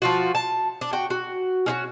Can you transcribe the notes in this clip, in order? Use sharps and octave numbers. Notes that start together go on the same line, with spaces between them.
F3 F4 F#4
A5
D4
F#4 G5
F#4
C#4 D#4 F#4